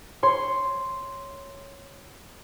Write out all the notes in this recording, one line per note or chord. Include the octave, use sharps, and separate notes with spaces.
C#5 C6